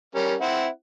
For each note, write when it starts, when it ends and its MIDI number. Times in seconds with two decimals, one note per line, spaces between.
0.15 0.35 55
0.15 0.35 61
0.15 0.35 70
0.41 0.67 60
0.41 0.67 64
0.41 0.67 78